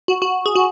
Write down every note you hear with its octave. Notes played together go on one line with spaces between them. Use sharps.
F#4
F#4
G#4
F#4